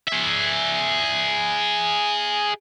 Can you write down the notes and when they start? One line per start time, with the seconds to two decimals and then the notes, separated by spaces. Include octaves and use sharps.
0.08 G#4 E5